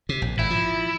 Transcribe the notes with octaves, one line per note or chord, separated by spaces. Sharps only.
C3
A#1
G#1 E4
F3